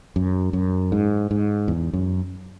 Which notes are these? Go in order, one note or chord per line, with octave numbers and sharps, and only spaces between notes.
F#2
F#2
G#2
G#2
E2
F#2